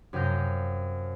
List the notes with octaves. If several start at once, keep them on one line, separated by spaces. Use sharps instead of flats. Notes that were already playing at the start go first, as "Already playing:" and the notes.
F#2 C3 D#5 F5 G6 A#6